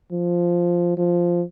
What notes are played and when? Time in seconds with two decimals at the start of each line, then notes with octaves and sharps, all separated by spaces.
0.12 F3
0.97 F3